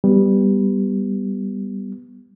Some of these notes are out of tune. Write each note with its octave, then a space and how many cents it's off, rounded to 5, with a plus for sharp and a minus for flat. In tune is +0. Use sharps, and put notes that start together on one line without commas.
G3 +0 B3 +0